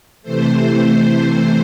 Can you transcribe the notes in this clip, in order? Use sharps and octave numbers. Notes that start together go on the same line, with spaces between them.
C3 E3 A3 C5